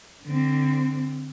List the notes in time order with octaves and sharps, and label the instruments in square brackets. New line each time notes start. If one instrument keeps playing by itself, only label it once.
[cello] D3 C4